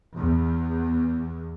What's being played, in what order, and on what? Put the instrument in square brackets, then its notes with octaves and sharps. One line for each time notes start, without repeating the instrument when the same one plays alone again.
[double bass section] E2